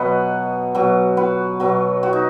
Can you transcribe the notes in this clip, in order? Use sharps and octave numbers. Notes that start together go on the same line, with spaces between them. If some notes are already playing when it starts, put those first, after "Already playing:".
Already playing: B2 F#3 B4 D#5 F#5
B2 F#3
F#4 B4
B2 F#3
F#4
D#4